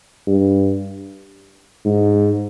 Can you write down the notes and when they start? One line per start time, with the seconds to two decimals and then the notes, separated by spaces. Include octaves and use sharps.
0.27 G2
1.85 G#2